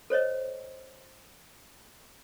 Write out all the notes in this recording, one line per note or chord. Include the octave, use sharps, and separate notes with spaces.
A4 C5 C#5 D#5